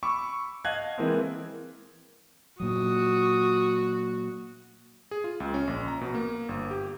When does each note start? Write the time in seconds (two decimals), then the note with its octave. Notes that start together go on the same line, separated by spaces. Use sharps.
0.03 B5 C#6 D6 E6
0.65 D#5 F5 F#5 A5 F#6 G#6
0.98 E3 G#3 A#3 C4
2.60 A#2 F#3 F#4 D#6
5.11 G#4
5.24 F4
5.40 C#2
5.54 C#4
5.67 A#1
5.88 A#5
6.01 B2
6.15 A#3
6.49 G1
6.71 G4